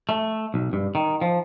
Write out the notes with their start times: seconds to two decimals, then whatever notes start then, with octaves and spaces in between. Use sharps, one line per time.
0.09 A3
0.54 B1
0.73 G2
0.95 D#3
1.21 F3